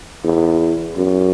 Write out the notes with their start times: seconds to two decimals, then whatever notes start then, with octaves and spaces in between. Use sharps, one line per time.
0.24 E2
0.97 F#2